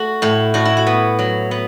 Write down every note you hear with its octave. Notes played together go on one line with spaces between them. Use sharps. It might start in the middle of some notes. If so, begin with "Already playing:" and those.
Already playing: A3 F#4 A4
A2 E4
A2 F#4
E4
F#4
B3
F#3
B3